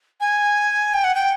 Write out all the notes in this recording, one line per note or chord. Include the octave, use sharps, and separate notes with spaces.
G#5
G5
F#5
G5